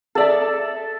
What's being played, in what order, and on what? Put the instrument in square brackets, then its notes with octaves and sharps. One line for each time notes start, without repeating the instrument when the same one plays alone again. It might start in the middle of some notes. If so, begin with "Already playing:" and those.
[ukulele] G#4 D5 E5 [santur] A4 A5